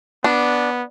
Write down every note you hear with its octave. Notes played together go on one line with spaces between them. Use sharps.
B3 D4